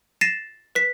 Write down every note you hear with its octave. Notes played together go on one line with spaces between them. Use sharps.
A6 A#6 C7 D#7 E7
B4 B6